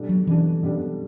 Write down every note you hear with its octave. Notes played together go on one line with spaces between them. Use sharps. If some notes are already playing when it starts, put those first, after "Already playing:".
Already playing: B2 G3 D4 A4
F#3
B2 E3 G3 D4 A4
B2 G3 D4 A4